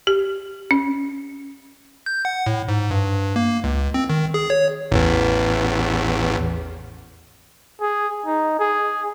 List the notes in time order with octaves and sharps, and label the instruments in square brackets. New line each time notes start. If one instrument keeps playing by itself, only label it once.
[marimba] G4
C#4
[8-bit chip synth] G6
F#5
A2
G#2
G2
A#3
C#2
C4
D#3
G#4
C#5
A1 E2
[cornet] G#4
D#4
G#4